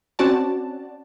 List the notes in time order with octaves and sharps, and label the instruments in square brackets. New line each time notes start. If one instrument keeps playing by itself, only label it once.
[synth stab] C4 C#4 F#4 D5 A5